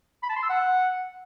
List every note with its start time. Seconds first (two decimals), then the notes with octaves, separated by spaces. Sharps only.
0.23 B5
0.29 A5
0.36 C6
0.43 E6
0.49 F#5